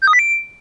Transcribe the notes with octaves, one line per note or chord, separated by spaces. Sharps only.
G6
D#6
B6
D7